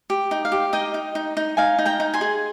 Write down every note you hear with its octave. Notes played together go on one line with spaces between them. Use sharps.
G4
D#4
F5
G4
D#4 D#5 G5
D#4
D#4
D#4
D#4 F5 G#5
D#4
G5 A#5
D#4
G#5 C6
G#4